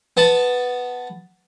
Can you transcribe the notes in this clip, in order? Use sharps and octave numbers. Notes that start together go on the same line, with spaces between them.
B3 A5 B5